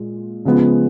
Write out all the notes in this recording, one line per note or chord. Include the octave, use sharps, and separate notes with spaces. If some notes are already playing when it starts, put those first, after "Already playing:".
Already playing: A#2 G#3
C#3 F3 G#3 B3